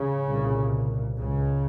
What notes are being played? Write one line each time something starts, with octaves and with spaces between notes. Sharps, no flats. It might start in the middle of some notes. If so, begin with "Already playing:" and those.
Already playing: C#3
C2 A#2
C#2 C#3